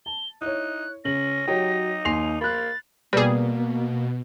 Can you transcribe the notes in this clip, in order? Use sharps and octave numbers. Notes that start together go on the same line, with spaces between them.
A5 G7
D#4 E4 C#5 F#6
C#3 C#4 A#6 F#7
F#3 D#4 G4 C#5 G5
D#2 G#5 C6 C7 F7
A#3 B5 F#6 A6
B2 G3 A#3 G#4 B4 D5